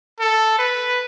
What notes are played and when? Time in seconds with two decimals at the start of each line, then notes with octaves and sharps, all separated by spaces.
0.20 A4
0.59 B4